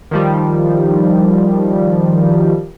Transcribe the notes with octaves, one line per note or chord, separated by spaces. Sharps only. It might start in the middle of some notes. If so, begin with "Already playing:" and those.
D#3 F3 G3